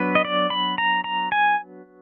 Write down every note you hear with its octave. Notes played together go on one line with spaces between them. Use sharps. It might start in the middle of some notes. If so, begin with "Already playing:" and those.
Already playing: F#3 B3 D4 B4
D#5
D5
B5
A#5
A#5
G#5